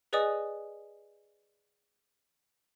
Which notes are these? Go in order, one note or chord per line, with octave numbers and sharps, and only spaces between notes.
G#4 B4 D5 D#5 G#5 D#6